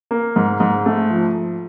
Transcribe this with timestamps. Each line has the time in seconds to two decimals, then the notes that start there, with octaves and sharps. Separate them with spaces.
0.11 A#3
0.36 G#2
0.60 G#2
0.86 A3
1.10 F3